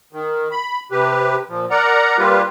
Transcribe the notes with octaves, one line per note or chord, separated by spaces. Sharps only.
D#3
B5
C3 G4 B4
A#2 F3
A#4 D5 F#5 A#5
G3 A#3 F4 G4 B4